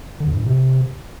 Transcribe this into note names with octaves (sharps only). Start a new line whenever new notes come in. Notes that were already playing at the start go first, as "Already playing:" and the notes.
D3
E2
G2
A2
C3